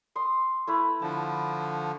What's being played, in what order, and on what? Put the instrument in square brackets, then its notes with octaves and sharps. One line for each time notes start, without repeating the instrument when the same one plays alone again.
[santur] C6 D#6
A3 E4 B4
[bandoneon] D3 F3 [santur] A5